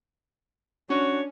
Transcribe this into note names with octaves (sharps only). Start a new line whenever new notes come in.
C#4 D4 F#4 C#5